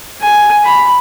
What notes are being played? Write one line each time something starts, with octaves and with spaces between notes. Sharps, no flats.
G#5
B5